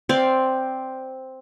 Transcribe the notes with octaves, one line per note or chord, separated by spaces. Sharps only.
C4 D5 F5